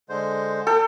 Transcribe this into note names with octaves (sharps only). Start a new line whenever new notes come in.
D3 G#3 C5
A4 G5